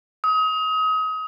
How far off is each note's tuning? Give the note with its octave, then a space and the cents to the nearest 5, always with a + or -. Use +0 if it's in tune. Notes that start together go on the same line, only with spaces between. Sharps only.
D#6 +30